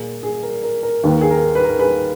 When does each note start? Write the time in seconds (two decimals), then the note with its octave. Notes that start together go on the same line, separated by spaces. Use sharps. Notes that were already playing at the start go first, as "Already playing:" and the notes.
Already playing: A#2 A#3 G#4
0.23 G#4
0.43 A#4
0.63 A#4
0.83 A#4
1.03 D#2 D#3 A#3 B4
1.12 A#4
1.21 G#4
1.31 A#4
1.55 B4
1.64 A#4
1.79 G#4 B4